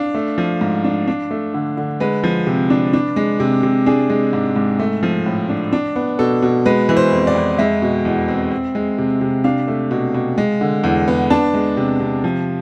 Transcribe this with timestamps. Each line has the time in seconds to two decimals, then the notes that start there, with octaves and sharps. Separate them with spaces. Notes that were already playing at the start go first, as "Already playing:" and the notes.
Already playing: D4 F5
0.15 A3
0.38 F3
0.61 G#2
0.84 D4
1.08 D4
1.31 A3
1.54 D3
1.77 D3
2.00 G#3 B4
2.24 F3
2.47 C3
2.70 D4
2.93 D4
3.16 G#3
3.40 C3
3.63 C3
3.86 D4 G#4
4.10 G#3
4.33 G#2
4.56 G#2
4.79 A3
5.03 F3
5.26 A2
5.49 D4
5.73 D4
5.96 B3
6.19 B2 A4
6.42 B2
6.66 G#3 B4
6.89 E3
6.97 C5
7.12 F2
7.27 D5
7.35 F2
7.58 G#3 E5
7.82 B2
8.05 E2
8.28 C4
8.52 C4
8.75 G#3
8.98 C3
9.21 C3
9.44 D4 F5
9.68 A3
9.91 B2
10.14 B2
10.38 G#3
10.61 D3
10.84 E2
11.08 B3
11.30 D4 A5
11.54 G#3
11.77 C3
12.00 C3
12.24 F3